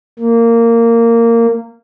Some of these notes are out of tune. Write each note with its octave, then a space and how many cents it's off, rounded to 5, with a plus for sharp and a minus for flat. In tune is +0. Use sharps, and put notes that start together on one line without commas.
A#3 -15